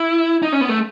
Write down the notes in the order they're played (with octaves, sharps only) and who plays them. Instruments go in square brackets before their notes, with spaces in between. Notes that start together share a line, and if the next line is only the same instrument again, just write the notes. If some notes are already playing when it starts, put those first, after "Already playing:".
Already playing: [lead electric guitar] E4
D#4
C#4
B3
A3